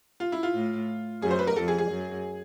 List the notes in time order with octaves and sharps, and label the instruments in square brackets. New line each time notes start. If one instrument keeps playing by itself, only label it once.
[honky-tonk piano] F4
E4
F4
[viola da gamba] A2
[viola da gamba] F#2 [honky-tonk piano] G#4
[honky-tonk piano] C5
B4
A#4
[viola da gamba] F2 [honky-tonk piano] A4
[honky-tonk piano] G#4
G#4
[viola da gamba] F#2